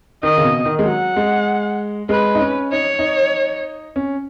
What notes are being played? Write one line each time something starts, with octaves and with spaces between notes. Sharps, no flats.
D#3 D#5
C#3
B2
D#3
G#3
F#3 F#5
G#3
G#3 B4
D#4
C#4
D#4 C#5
D#4
C#4